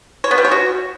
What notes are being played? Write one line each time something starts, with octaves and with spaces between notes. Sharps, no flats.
C#5
B3
G3
C#5
F#4